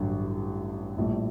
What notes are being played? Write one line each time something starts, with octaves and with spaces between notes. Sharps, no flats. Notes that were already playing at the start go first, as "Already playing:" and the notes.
Already playing: A1 G2 D3 F#3
A#1 A2 G3